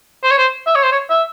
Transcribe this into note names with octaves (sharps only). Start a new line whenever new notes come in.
C5
C#5
C5
E5
C#5
C5
C#5
E5